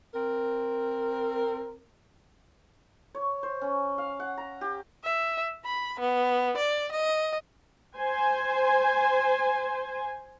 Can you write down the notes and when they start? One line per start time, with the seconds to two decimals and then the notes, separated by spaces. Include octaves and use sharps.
0.15 C4 A#4
3.15 C#5
3.43 C5
3.61 C#4
3.98 F5
4.20 F#5
4.38 A#5
4.61 G4
5.04 E5
5.65 B5
6.00 B3
6.56 D5
6.92 D#5
7.96 C5 G#5